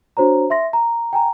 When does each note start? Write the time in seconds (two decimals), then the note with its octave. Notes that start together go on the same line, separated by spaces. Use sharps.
0.17 D4 F#4 C5 C#5 A#5
0.50 E5 C6 A#6
0.73 A#5
1.13 G5 G#5 A#5